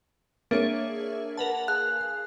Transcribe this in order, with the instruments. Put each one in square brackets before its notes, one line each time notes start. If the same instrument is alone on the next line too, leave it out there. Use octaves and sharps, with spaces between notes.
[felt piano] A#3 [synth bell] D4 G#4 C#5 [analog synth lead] E5
[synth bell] A#4 B4 A5 [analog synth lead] F#5
[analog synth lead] G#4 [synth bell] F5 [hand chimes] F#6